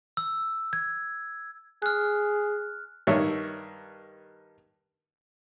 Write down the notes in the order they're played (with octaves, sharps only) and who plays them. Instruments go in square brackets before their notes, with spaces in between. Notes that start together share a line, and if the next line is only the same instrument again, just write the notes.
[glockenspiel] E6
G#6
[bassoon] G#4 [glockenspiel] F6 F#6
[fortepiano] G2 D#3 C#5 E5 C#6